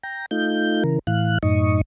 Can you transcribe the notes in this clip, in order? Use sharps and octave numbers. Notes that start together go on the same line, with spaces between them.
G5 A#5
A3 D#4 F4 G6
C#3 E3 A#4
A2 E3 F5 F#6
F#2 A2 D#4 D#5 C#6